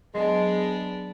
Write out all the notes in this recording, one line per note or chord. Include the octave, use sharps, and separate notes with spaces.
F#3 G#3 B3 D4